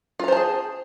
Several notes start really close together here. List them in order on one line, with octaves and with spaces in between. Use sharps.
F4 A#5 C5 A5 G#4